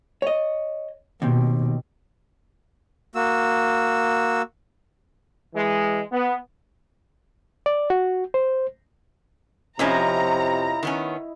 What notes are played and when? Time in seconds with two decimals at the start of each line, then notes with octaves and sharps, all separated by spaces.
0.22 C#5 D#5
1.22 D#2 B2 C4
3.15 A#3 F#4 E6
5.54 E3 G#3
6.11 B3
7.66 D5
7.90 F#4
8.34 C5
9.79 F2 C3 F3 C#4 E4 D#5 A#5
10.83 D#3 B3 C#4